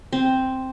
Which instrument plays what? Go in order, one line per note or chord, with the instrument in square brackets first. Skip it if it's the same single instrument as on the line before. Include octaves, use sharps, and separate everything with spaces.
[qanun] C4